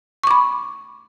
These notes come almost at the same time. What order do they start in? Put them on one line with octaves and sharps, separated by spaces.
C#6 D6 B5